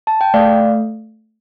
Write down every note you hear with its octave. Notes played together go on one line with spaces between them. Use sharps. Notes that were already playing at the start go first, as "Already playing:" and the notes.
A5
G5
A3 D5 F5